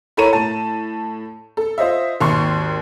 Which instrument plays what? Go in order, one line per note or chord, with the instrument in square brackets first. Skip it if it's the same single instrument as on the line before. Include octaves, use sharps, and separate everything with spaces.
[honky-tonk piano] E4 A4 A#4 C#5 A#5 D#7
A2 A5
A4
F4 C5 D#5 E5
G#1 D#2 C6 C#6